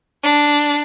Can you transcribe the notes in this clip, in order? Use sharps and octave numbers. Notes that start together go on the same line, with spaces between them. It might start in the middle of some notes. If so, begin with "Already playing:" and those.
D4